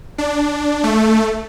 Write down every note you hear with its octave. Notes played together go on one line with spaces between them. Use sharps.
D4
A3